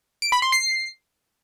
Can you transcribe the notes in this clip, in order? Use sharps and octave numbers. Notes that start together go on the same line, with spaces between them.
D7
B5
C6
C7